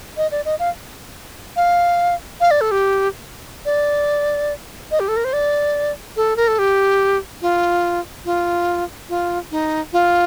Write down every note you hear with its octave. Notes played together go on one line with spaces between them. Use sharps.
D#5
D5
D#5
F5
F5
F5
D5
A4
G4
D5
D#5
G4
A4
A#4
C5
D5
A4
A#4
A4
G4
F4
F4
F4
D#4
F4